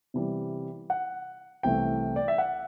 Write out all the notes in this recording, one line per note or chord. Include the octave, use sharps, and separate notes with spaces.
C3 E3 G3
F#5
C2 C3 E3 A3 G5
D5
E5
F#5